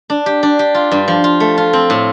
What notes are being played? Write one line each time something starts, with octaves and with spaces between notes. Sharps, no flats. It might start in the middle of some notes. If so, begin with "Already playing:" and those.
D4
G4
D4
G4
F4
G2
F3
F4
A3
F4
C4
A2